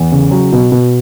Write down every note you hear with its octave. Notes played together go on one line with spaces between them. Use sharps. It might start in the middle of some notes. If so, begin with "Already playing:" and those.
Already playing: E2
C#3
F#3
B2
B2